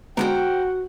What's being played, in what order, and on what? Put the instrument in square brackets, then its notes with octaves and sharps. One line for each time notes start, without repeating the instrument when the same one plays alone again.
[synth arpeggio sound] D3 G#3 B3 [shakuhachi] F#4 [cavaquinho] A#4 C5 G5 [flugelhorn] F#5